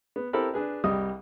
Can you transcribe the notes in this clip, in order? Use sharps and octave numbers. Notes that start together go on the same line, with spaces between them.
B3
C4 E4 G4 A4 A#4 B5
D4 G#4 B4
C2 G3 D#5 D#6